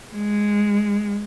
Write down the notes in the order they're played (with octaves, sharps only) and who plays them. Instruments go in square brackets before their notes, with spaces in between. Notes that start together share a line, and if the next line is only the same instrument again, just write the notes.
[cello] G#3